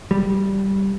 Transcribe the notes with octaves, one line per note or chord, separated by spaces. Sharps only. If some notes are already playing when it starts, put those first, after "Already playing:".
G3